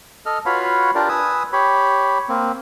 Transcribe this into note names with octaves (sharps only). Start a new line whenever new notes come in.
A4 D#5 F6
F4 F#4 B4 C#5 F5 B5
D4 F4 G4 A#4 D5
B4 G#5 D#6 E6
G4 C#5 B5
A#3 C4